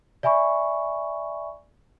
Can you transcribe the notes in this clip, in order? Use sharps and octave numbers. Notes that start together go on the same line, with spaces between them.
D5 E5 G#5 B5 C#6